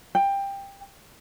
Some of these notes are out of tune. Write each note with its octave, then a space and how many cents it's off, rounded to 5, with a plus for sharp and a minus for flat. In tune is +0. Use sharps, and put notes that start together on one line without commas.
G5 +15